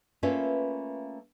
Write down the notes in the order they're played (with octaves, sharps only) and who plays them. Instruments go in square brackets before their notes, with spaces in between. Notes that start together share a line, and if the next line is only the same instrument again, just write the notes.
[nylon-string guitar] A3 A#3 C#4 F4 B4 E5